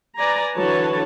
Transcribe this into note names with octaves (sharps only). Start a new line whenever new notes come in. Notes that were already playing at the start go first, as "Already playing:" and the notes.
B4 D5 G#5 A#5
D3 E3 F#3 B4 C#5 A5